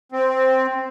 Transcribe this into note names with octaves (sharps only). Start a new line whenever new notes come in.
C4